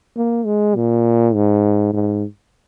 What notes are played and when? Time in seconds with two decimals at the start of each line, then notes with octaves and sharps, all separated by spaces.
0.16 A#3
0.46 G#3
0.75 A#2
1.35 G#2
1.93 G#2